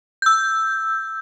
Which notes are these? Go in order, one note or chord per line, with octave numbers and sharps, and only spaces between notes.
E6 G6